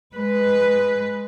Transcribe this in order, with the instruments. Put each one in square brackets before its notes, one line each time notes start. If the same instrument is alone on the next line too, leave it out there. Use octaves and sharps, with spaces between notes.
[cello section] G#3 B4